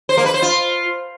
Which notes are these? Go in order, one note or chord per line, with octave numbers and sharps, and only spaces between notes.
C5
A#3
B4
C5
F4